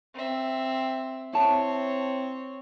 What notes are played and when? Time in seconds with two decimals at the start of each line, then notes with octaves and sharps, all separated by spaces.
0.14 C4 E5
1.33 C4 E4 C#5 A5